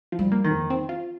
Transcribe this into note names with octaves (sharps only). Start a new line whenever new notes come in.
F3
G3
A#3
D#3
F2
C4
F4